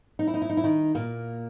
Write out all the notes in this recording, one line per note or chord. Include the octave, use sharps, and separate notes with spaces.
D#4
E4
D#4
E4
D#4
E4
D#3 D#4
A#2 A#3